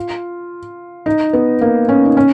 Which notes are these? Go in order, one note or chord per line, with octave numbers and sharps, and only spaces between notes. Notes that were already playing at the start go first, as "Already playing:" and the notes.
Already playing: F4
D#4
B3
A#3
C#4
D#4
C#4